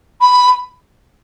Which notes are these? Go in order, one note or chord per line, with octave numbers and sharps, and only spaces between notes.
B5